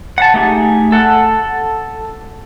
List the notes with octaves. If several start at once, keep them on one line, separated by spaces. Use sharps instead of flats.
F#5 A5
A3 D#4 G4 G#4
A4 F#5